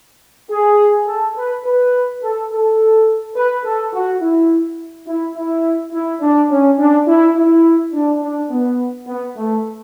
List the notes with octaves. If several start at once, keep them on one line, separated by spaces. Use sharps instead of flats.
G#4
A4
B4
B4
A4
A4
B4
A4
F#4
E4
E4
E4
E4
D4
C#4
D4
E4
E4
D4
D4
B3
B3
A3